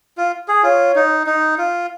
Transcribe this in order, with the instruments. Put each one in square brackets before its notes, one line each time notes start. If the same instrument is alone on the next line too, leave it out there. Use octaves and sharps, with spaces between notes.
[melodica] F4
G#4
[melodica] F4 [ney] C#5
[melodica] D#4
D#4
F4